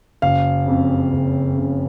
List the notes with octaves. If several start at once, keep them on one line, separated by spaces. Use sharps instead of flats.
F#1 F5
F2 C#3
F#1
F2 C#3